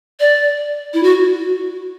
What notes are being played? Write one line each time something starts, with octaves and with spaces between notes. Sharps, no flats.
D5
E4
F#4